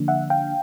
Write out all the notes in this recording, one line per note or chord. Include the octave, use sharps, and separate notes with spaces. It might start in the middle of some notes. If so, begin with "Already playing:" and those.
Already playing: D3 F3 A#3 D4
E5 F#5
F5 G5